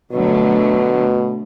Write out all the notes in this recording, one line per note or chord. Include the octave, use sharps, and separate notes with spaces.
B2 D3 F#3 A3